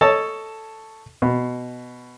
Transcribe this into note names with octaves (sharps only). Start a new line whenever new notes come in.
A4 C#5 D#5 A5
B2